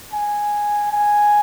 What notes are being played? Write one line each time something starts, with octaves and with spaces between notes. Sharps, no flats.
G#5
G#5